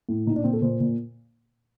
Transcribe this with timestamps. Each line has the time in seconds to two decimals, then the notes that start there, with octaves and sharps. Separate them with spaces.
0.09 A2
0.26 A#2 D#4
0.36 D4
0.44 A#2 C4
0.53 A4
0.62 A#2 C5
0.80 A#2